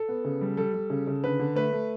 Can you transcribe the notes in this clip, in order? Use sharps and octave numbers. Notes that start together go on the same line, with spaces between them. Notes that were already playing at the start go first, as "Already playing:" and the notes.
Already playing: A4
B3
C#3
G3
G3 A4
G3
C#3
C#3
D3 B4
D3
A3 B4
A3